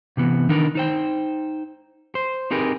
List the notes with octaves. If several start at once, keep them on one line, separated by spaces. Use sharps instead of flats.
C3 E3 B3
D#3 D4 D#4 A#4 B4
D#4 C5 G5
C5
C4 D#4 G4 G#4 A#4 B4